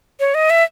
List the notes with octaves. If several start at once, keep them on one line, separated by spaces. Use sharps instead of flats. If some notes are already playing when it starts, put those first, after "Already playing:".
C#5
D#5
E5